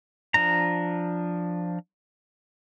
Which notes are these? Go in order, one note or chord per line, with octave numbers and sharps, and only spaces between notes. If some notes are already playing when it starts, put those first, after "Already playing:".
F3 D4 A#5